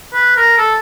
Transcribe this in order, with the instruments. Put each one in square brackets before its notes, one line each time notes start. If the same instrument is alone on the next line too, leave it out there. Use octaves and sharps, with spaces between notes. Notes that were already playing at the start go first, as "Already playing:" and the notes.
[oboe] B4
A#4
A4